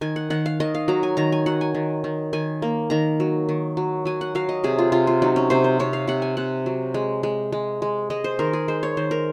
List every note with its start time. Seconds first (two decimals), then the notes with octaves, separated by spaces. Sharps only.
0.01 D#3 G#5
0.16 F#5
0.30 D#3 F#5
0.46 F5
0.60 D#3 D#5
0.75 F5
0.88 F#3 A#5
1.03 G#5
1.17 D#3 A#5
1.32 G#5
1.46 F#3 F#5
1.61 G#5
1.75 D#3
2.04 D#3
2.33 D#3 G#5
2.62 A#3
2.90 D#3 A#5
3.20 F#3
3.49 D#3
3.77 F#3
4.05 F#3 G#5
4.21 F#5
4.35 F#3 F5
4.49 D#5
4.64 C3 G#4
4.79 F4
4.92 C3 F4
5.07 F4
5.22 F#3 D#4
5.36 C#4
5.50 C3 C5
5.64 C5
5.79 C3 C#5
5.93 F5
6.07 C3 F#5
6.22 G#5
6.37 C3 F#5
6.66 F#3
6.94 G#3
7.23 G#3
7.52 G#3
7.82 G#3
8.10 G#3 D#5
8.24 C5
8.39 D#3 A#4
8.53 G#4
8.68 G#3 C5
8.83 C#5
8.97 D#3 C5
9.11 A#4